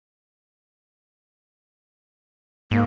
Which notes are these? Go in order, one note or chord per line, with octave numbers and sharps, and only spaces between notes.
G#2 A#3